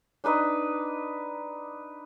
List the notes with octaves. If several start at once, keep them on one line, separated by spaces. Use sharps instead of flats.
D4 D#4 B4 D#5